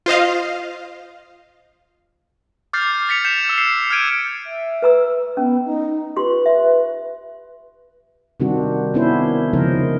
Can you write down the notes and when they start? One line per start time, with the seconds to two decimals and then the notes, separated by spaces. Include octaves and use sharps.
0.06 F4 C5 D#5 F5
2.73 D6 F6 G6 A6 C7
3.09 A6 B6 C#7 F7
3.25 G6 B6 C#7 E7
3.45 E6 E7
3.58 C7
3.90 F6 G6 G#6 D7 D#7
4.44 E5
4.82 B4 A#5 E6
5.37 B3 C#4
5.65 D#4
6.16 F4 G4 B4 C6
6.46 E5
8.40 C3 D#3 G3 C4 D4 F#4
8.94 D#3 B3 C#4 D4 E4 C5
9.53 C#3 F3 G#3 D#4 A#4 C5